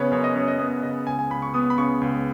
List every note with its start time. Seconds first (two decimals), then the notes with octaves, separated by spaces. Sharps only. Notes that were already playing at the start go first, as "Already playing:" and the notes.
Already playing: F#2 C#3 B3 B4 C#5
0.11 F#2 C#5
0.24 D#5
0.36 F#2 C#5
0.48 D#5
0.59 B3 D#5
0.83 C#3 D#5
1.07 C#2 G#5
1.19 G#5
1.30 C#2 B5
1.42 C#6
1.54 B3 D#6
1.70 B5
1.78 C#3 C#6
2.01 C#2